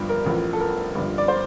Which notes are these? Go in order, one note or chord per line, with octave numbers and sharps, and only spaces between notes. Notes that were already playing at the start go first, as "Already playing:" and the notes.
Already playing: G1 G2 D3 F3
A#4
A1 A2 F3
A4
A#4
G1 G2 D3 F3
D5
C5